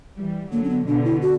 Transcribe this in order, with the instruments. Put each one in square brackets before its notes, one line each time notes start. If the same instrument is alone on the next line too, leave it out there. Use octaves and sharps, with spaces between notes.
[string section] E3 G3
[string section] D3 F#3 [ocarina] A#3
[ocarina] C#4
B3
[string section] B2 D3 [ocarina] D4
[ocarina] E4
F#4